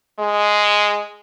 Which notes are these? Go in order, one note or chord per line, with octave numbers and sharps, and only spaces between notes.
G#3